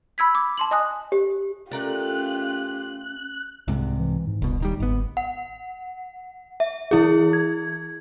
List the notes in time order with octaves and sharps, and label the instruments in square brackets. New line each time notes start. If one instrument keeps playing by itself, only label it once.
[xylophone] B5 E6 G#6 B6
D6
A5 C6 F#7
D#5 G#5 D#6 F#6
[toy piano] G4
[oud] A3 A#4 D5 [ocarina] C#4 [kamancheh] F4 G4 [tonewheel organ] F#6
[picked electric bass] C2 G#2 C3
[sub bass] E3
G#2
[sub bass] D#1 [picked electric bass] C2 B2
[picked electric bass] D#2 D#3 G3
[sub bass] G1 [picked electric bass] G#2 B3
[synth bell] F#5
E5
E3 E4 G#4
G#6